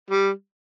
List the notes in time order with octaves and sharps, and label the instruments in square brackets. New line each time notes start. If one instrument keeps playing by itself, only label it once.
[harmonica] G3